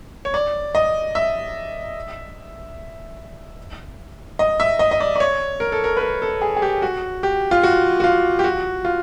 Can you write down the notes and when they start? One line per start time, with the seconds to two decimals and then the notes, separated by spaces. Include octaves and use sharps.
0.25 C#5
0.34 D5
0.75 D#5
1.15 E5
4.39 D#5
4.60 E5
4.79 D#5
4.91 D#5
5.00 D5
5.16 D5
5.20 C#5
5.60 A#4
5.72 A4
5.84 A#4
5.97 B4
6.01 A#4
6.22 A4
6.42 G#4
6.57 G#4
6.62 G4
6.82 F#4
7.23 G4
7.51 F4
7.63 F#4
8.00 F#4
8.04 F4
8.39 G4
8.44 F#4
8.85 F4